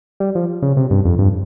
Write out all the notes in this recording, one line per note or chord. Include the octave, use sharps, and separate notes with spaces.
G3
F3
C#3
C3
G2
F2
G2